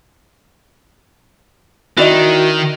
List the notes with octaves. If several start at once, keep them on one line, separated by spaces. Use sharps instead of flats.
D#3 E4 F#4 D5 D#5